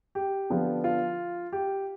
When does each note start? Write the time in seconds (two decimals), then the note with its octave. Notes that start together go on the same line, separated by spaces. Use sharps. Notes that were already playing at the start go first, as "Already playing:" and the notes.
0.15 G4
0.50 D3 F3 B3 D4 F4
0.84 F4
1.52 G4